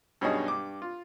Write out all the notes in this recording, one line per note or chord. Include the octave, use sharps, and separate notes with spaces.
G2 B2 F#3 C#4 D#4 G#4
G2 D6
F4